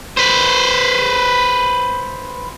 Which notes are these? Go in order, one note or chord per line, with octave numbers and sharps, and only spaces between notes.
B4 C5